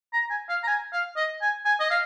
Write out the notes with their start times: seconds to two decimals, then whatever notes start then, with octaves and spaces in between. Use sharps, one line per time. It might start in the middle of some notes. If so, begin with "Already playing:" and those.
0.13 A#5
0.30 G#5
0.49 F5
0.63 A#5
0.67 G#5
0.93 F5
1.16 D#5
1.41 G#5
1.65 G#5
1.80 D#5
1.90 F5